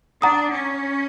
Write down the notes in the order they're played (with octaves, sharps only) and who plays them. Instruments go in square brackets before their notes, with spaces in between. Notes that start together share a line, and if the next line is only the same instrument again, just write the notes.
[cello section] D4 [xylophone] F#5 A#5 D#6
[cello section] C#4